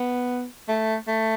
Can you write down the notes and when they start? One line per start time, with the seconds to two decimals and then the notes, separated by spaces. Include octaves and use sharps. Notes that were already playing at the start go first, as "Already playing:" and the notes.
Already playing: B3
0.68 A3
1.08 A3